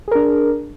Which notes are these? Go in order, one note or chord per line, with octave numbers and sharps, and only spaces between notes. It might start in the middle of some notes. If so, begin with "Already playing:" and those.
D4 G#4 A#4